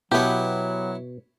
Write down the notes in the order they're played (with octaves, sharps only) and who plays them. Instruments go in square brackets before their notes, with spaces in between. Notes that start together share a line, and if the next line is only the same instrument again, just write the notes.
[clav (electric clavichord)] B2 [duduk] F#3 [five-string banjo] B3 G4 [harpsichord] E4 C#5